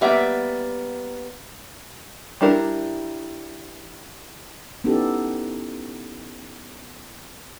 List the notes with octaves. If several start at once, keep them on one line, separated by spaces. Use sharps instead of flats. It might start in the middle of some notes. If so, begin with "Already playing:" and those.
G3 A#3 B3 E5 G5
G3 D4 E4 A#4
B3 C#4 D#4 E4 G4 A4